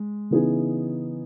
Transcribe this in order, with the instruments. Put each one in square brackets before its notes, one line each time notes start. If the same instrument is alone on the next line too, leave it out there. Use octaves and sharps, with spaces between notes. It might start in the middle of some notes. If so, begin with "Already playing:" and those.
Already playing: [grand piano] G#3
C#3 E3 B3 D#4 G#4